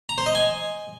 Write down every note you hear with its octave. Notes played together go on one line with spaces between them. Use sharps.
A#5
C5
D#5
G#5